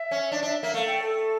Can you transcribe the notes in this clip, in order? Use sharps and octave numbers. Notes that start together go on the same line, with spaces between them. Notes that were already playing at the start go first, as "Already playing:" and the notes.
Already playing: E5
C#4
D4 D5
D4 E5
A#3 E5
A3 F5
G5
A4